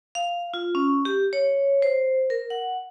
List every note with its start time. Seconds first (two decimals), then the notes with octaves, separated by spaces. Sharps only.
0.15 F5
0.54 F4
0.75 C#4
1.05 G4
1.33 C#5
1.82 C5
2.30 A#4
2.50 F#5